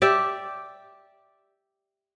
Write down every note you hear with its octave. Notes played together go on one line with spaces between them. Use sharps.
G4 D5 E5